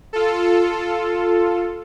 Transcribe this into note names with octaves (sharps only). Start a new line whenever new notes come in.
F4 A4